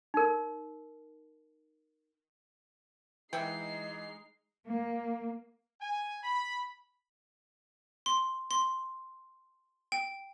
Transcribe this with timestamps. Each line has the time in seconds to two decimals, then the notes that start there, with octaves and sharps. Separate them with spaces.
0.14 D#4 A#4
3.33 E3 G#3 D#4 E5 F#5 G5 C7
4.67 A#3
5.81 G#5
6.23 B5
8.06 C6
8.51 C6
9.92 G5